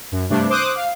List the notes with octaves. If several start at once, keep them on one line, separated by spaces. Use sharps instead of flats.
F#2
G2 C3 A3 D4
C5 D6 D#6 F#6
F5